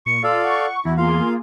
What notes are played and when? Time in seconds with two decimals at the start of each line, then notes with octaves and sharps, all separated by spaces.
0.06 A#2 C#6 C#7
0.23 F4 A4 D5 F5 E6
0.43 F#5 C#6
0.85 E2 E4 F#4
0.97 A#3 F4 G#4 F5 C6